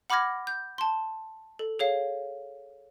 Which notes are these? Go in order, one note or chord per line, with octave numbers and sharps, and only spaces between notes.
F#5 B5 D6 F6 G#6 A#6
G6
A5 C6
A4
G#4 C#5 F5